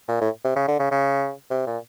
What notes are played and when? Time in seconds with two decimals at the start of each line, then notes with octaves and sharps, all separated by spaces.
0.08 A#2
0.21 A2
0.44 C3
0.56 C#3
0.68 D3
0.79 C#3
0.91 C#3
1.51 C3
1.67 A#2